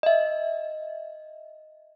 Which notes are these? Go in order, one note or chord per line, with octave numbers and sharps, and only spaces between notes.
D#5 E5